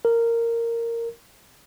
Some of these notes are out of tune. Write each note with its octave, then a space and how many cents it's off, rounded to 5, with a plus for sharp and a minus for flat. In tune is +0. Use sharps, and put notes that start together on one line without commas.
A#4 -10